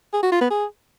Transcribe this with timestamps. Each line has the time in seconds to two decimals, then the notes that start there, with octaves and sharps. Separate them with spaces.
0.14 G#4
0.23 F#4
0.32 F4
0.41 B3
0.50 G#4